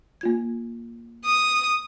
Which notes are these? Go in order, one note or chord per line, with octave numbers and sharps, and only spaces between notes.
A#3 F4 G#6
D#6